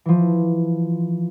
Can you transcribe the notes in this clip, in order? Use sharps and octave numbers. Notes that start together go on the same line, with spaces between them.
E3 F3